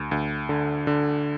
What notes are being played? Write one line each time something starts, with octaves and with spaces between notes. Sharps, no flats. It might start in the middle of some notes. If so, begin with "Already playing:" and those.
Already playing: D2
D2
D3
D3